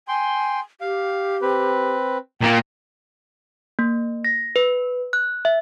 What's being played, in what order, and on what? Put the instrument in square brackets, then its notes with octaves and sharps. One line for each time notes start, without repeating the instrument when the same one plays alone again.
[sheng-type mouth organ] G5 C6 [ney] G#5
[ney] G4 [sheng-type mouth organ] F5
[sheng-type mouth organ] C4 B4
[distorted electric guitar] A#2 A#3 [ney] G5
[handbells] A#3
A#6
B4
F#6
E5